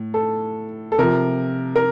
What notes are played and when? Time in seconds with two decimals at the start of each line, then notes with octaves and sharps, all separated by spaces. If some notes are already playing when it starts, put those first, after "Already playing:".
Already playing: A2
0.14 A4
0.92 A4
0.98 C3 F3 A#4
1.76 A#4